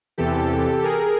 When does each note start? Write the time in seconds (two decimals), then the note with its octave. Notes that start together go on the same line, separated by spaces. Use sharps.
0.18 E2 C3 E3 G4 A4
0.84 G#4 A#4